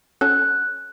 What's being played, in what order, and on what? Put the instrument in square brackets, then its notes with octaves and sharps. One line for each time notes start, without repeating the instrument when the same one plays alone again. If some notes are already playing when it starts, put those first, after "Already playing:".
[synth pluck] C#4 F#4 A4 [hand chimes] F#6